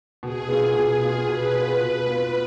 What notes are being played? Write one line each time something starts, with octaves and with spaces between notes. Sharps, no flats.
B2 G#4
B3 F4
B2 G#4
B3 F4
B2 B4
B3 F4
B2
B3 F4